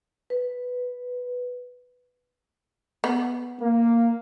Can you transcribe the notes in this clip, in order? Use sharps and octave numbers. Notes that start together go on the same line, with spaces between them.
B4
B3
A#3